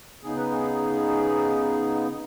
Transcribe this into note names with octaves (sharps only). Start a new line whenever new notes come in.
C#3 B3 D#4 G#4
B4
G#4